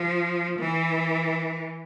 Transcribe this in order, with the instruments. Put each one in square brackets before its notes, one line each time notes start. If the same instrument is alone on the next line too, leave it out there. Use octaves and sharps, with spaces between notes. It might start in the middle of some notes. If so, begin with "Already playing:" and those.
Already playing: [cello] F3
E3